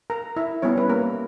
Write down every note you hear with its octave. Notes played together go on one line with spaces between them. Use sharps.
A#4 A#5
E4 E5
G3 B3 C#4 E4 G4 C#5
B4
A#3 A#4